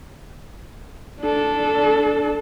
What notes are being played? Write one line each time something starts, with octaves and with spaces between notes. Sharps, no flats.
D4 A4